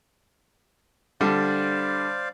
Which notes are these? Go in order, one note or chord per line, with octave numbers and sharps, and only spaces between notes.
D3 G3 D4 C5 D5 F5